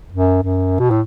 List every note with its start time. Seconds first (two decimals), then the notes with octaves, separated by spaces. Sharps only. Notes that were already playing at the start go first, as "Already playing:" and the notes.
0.12 F#2
0.42 F#2
0.79 B2
0.90 A2